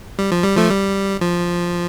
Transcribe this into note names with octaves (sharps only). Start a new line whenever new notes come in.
G3
F3
G3
F3 A3
G3
F3